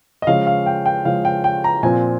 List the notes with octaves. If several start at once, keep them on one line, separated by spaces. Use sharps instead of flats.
D#5
C#3 F3 G#3 C#4 F5
F5
G5
G5
C#3 F3 G#3 C#4 F5
G5
G5
A#5
A#2 F3 C4 G#5